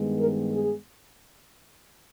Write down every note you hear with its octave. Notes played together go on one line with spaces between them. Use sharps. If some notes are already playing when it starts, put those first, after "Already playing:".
Already playing: G2 D#3 G#3 B3
A#4
G#4